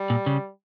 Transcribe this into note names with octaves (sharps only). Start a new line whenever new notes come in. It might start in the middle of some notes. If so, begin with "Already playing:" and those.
Already playing: G3
A#2
C#3